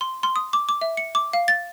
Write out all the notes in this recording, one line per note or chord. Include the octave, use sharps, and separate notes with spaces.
C6
C6
D#6
D6
D6
E5
C#7
D6
F5
A6